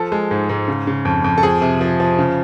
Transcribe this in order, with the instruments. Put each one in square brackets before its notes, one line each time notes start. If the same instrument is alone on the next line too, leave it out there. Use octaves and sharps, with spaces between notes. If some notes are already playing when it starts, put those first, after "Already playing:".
Already playing: [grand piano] F3 A4
G#3
G#2
G#2
C#3
C#3
F2
F2
A4
F3 G#4
C3
F3
F3
C#3